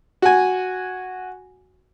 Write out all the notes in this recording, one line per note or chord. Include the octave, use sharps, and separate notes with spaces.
F#4 G#5